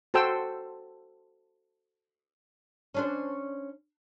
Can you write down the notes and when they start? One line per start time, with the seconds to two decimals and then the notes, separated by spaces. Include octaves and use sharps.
0.14 F#4 A4 C5 G5 E6
2.95 C#4 D4 C5